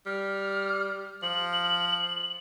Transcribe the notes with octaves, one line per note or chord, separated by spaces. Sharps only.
G3 F6
F3 F#7